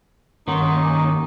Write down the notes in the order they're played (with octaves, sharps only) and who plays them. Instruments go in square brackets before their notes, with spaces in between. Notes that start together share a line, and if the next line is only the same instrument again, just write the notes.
[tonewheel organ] G2 A#3 C#4 [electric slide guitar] D#3 [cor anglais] D#4 [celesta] F#5 C6 C#6
[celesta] G#5 C#6 D6